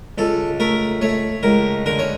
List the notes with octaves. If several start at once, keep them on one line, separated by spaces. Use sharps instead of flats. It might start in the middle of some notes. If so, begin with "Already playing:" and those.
C#2 A4
A3 A#4
A3 C#5
C#2 A#4
D3 A#4
C#5